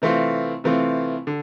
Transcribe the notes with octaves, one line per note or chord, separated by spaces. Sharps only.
C3 E3 A3 C4 F4
C3 E3 A3 C4 F4
D3